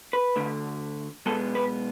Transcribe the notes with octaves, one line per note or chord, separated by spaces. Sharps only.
B4
D2 D3 A3
B1 B2 G#3 B3 A4
B4